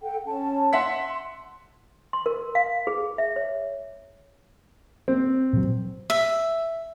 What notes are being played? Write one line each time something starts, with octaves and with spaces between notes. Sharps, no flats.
A4 F#5 G5
C#4 A5
E5 F#5 C6 B6
C6
A#4
F5
G#4
E5
C#5
C4
A#2 F3 F#3
E5